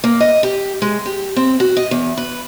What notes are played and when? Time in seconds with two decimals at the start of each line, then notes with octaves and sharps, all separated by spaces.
0.04 A#3
0.21 D#5
0.43 G4
0.82 G#3
1.06 G4
1.36 C4
1.60 F#4
1.77 D#5
1.91 E2
2.17 B4